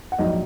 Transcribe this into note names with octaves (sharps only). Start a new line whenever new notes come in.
F#5
A#1 G#2 F#3 D#4 D#5